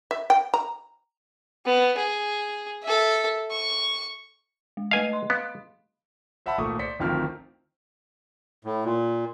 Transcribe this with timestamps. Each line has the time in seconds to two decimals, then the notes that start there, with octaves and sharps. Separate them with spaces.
0.11 E5
0.30 G5
0.54 A#5
1.66 B3
1.97 G#4
2.83 A4 E5
3.51 C#6
4.77 G#3
4.91 A3 B4 D#5 F5 G#5
5.09 D#5 C6
5.30 B3 F5
6.46 C5 E5 F#5 A5 B5
6.58 G#1 A#2 A3 C#6 D#6
6.79 C5 D5 B6 C#7
6.99 G#1 D2 D#3 F3 C4 F6
8.65 A2
8.85 A#2